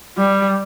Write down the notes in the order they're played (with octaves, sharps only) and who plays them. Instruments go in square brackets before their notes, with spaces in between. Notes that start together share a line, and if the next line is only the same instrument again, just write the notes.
[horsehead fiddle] G3